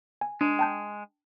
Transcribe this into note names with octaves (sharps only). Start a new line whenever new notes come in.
G#5
G#3 D4
G5 A5 G6